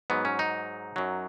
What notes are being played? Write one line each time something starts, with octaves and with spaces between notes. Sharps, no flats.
G#2 F#3 B3
C#4
D#4
F#2 F#3